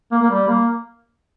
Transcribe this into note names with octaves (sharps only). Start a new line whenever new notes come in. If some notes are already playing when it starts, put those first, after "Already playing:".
A#3
A#3
G3
A#3